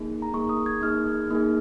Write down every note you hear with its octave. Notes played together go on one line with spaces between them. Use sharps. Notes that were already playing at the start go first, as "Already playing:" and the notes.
Already playing: A#3 D#4 G#4
A#5
A#3 D#4 G#4 C#6
D#6
G#6
A#3 D#4 G#4 F6
A#3 D#4 G#4